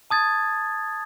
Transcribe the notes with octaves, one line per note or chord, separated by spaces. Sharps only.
A5 D#6 G#6 A6